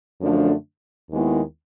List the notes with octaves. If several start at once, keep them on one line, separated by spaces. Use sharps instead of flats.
F#2 D3 F3 A3 D4
D#2 D#3 G#3 B3 E4